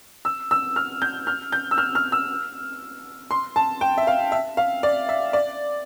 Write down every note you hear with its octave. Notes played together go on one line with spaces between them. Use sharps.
E6
E6
F6
G6
F6
G6
E6
F6
F6
E6
C6
A5
G5
E5
F5
E5
F5
D5
E5
D5